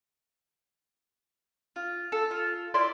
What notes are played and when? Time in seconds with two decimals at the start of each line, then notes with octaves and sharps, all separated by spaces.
1.76 F4
2.12 A4
2.31 F4
2.74 E4 D5 C6